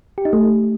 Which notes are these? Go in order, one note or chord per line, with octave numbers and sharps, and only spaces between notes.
G4
D#4
A3